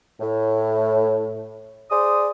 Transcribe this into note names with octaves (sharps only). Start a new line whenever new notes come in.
A2
G#4 C5 D5 D#6